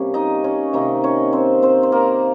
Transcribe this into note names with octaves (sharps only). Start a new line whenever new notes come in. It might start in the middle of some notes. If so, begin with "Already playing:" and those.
Already playing: C3 G3 A#3 C#4 C#5
D#4 D#5
C#4 C#5
C3 D#3 A#3 D#4 D#5
C#4 C#5
C4 C5
C4 C5
C5
A#3 A#4